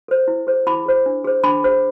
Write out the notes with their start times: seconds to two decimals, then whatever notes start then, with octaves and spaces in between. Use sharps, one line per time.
0.08 A4 C5
0.28 E4
0.47 G#4 C5
0.67 E4 B5 D6
0.86 G#4 C5
1.06 D4
1.25 G#4 C5
1.44 D4 B5 D6
1.64 G#4 C5